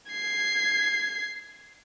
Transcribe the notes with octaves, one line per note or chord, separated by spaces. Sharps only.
G#6 C7